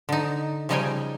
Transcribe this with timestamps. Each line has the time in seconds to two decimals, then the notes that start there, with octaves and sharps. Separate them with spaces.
0.09 D3 D#4
0.69 C#3 F3 G3 D#4 G5 G#5